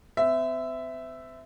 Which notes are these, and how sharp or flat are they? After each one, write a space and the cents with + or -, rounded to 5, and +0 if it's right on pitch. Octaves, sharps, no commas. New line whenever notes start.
C4 -45 E5 +0